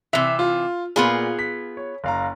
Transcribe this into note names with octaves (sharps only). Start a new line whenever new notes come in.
C3 E3 E5 F7
F4
A#2 B3 F4 G#4 B5
B6
C#5
F#1 F5 A#5